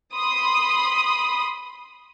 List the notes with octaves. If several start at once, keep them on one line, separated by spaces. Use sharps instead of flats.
B5 C6 D#6